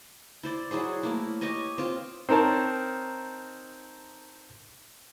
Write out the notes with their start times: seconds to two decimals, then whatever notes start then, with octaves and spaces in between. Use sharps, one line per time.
0.43 E4 C5 D5
0.71 F#3 E4 G#4 C5
1.03 A3 A#3 E4
1.41 G4 C#5 D#5 G#5
1.78 C4 F4
2.29 C4 D#4 A#4 C#5 A5